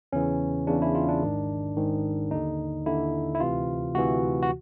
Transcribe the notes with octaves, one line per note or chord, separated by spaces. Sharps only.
E2 C#3 E3 C#4
E2 C#3 E3 D4
E4
F4
D4
G#1 G#2 D#3
G#1 G#2 D#3
D#2 D3 D#4
D#2 D3 E4
E4
D2 C3 E3 F4
D2 C3 E3 F#4
F#4